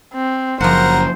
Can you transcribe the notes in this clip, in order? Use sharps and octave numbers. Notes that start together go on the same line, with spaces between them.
C4
F#1 F3 F#4 A#4 C5 F#5